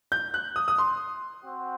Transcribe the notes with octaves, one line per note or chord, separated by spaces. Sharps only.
G6
F#6
D#6
D#6
C6
C4 F#4 C5 F#5